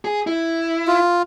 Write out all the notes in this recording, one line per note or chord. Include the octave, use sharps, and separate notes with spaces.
G#4
E4
F4